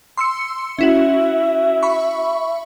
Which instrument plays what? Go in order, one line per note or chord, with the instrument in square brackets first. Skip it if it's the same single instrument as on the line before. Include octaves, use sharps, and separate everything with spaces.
[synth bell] C6 E6 C#7
[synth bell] C#4 E4 F#4 [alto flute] E5
[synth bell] B5 C#6